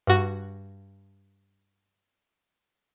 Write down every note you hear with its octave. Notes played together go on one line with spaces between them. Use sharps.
G2 F#4